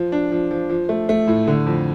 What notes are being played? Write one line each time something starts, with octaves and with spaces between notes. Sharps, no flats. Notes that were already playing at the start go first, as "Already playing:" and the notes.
Already playing: F3
D4
F3
F3
F3
A3
A3
A2
D3
F2